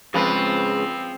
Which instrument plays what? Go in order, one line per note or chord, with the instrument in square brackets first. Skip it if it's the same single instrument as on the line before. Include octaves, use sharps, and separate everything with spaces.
[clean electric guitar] C#3 G#3 B4 [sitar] F3 [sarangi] C4